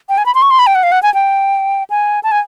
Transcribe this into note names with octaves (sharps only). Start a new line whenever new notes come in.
G5
G#5
B5
C6
C#6
C6
B5
G5
F#5
F5
F#5
G#5
G5
G#5
A5
G#5